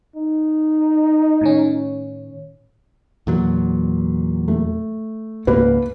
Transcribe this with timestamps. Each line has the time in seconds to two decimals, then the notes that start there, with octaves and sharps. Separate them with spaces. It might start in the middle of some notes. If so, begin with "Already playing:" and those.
0.16 D#4
1.41 A2 D#3 C#4
3.27 E2 A#2 F#3
4.48 A3
5.47 C#2 G#2 A#3 B4